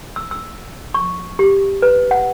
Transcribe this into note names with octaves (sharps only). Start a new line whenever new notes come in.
E6
E6
C#6
G4
B4
F#5